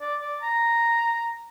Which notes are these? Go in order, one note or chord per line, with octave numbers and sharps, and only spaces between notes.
D5
D5
A#5